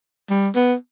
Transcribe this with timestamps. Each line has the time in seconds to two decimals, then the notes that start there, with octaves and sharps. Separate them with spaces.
0.30 G3
0.55 B3